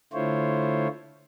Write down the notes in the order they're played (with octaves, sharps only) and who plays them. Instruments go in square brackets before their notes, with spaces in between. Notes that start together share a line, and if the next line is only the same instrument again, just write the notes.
[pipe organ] D3 A3 E4 F4 C5 C#5